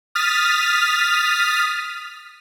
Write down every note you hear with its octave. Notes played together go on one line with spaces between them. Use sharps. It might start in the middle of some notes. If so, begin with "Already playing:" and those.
D#6 F6 A6 B6